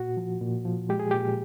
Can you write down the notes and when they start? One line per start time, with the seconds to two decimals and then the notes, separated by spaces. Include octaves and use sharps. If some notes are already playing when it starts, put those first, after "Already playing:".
Already playing: A#2 F#4
0.17 F3
0.41 A#2
0.65 F3
0.89 G#3 G4
1.00 G#4
1.11 A#2 G4